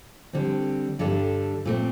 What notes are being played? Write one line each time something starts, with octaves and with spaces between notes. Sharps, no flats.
D3 G3 C4
G2 D3 G3 D4 A4
A#2 A3 C4